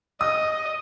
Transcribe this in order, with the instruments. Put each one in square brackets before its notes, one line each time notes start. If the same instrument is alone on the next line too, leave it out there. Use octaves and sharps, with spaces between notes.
[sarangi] D#5 [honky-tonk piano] D#6